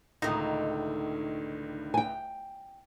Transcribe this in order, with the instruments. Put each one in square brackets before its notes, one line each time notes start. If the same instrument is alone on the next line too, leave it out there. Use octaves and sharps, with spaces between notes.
[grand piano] C#2 A2 [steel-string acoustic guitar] D3 D#3 [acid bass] D#4
[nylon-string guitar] G5 G#5